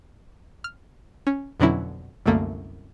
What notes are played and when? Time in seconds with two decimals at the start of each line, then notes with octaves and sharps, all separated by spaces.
0.64 F6
1.27 C#4
1.60 F2 B2 D3 F#3 C#4 E4
2.26 C2 F#2 D3 A3 A#3